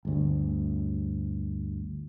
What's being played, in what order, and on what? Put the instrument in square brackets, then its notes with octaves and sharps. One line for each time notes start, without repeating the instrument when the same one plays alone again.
[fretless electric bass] G1 D2